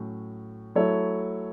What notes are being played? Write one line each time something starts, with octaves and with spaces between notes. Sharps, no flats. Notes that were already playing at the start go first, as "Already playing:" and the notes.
Already playing: A2 F#3 C#4
F#3 A3 E4 A4 C#5